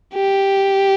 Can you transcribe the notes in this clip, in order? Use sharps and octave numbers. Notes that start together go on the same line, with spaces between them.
G4